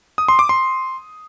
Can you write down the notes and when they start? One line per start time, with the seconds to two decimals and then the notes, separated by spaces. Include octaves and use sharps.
0.18 D#6
0.29 C6
0.39 D6
0.49 C6